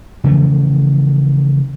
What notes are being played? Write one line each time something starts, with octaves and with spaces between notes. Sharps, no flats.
C#3 E3 F3 A3